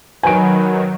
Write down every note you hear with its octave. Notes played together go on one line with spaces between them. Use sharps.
D#3 F#3 B4 G#5 D7